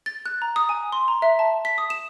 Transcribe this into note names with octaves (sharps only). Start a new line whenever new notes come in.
A6
F#6
A#5
D#6
G#5
C6
A#5
E5
A5
B6
D#6
E7